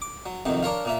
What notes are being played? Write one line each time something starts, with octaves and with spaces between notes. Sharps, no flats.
D6
F#3
F2 C3 D#3 F#3
D4 A#4 C#5 F5
A#2 A#3 E5